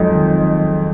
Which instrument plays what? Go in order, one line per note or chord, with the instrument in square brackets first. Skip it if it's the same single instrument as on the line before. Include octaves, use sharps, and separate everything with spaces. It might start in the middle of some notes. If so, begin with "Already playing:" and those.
Already playing: [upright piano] F2 G#3 D#4 [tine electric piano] F3 F#3
[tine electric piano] D#3